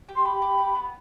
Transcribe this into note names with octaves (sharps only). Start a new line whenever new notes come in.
G4
C6
G4 B5
G4
G4
B3